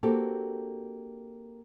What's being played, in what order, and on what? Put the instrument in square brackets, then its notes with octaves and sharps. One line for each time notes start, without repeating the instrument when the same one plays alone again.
[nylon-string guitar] A#3 C4 D4 F#4 G4 A4